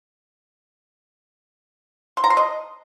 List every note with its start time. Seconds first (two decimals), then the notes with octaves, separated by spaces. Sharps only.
2.17 C6
2.24 A#5
2.30 C6
2.37 D#5